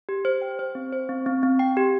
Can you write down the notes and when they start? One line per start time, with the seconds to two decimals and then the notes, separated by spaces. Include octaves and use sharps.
0.09 G4
0.25 C5
0.42 G5
0.59 C5
0.75 C4
0.92 C5
1.09 C4
1.26 C4
1.43 C4
1.59 G5
1.77 G4